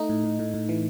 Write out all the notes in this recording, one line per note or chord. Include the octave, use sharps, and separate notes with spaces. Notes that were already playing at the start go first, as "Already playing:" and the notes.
Already playing: A3 D#4
A2
A2
A2
A2
E3